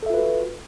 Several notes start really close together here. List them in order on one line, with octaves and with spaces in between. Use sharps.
A4 E5 F4 B4 F#4